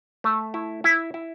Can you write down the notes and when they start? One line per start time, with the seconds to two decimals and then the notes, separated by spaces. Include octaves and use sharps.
0.24 A3
0.54 E4
0.84 E4
1.14 E4